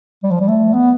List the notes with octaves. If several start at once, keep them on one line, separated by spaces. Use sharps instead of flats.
G3
F3
G3
A3
B3